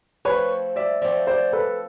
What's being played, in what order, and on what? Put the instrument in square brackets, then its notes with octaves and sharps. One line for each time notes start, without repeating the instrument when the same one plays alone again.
[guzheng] F3 A3 C4 [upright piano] B4 C#5
[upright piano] D5 E5
[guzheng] F3 A3 C4 [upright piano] D5 E5
[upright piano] C5 D5
A4 B4